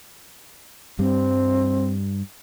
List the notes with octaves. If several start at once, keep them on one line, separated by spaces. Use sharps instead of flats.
G2 G3 C4